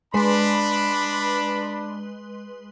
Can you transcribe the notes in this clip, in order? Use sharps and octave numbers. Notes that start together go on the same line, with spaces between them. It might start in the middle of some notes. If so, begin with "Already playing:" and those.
G#3 D4 B4 B5 C6